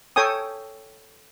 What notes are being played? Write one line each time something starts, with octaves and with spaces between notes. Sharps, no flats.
A4 C#5 G5 G#5 D#6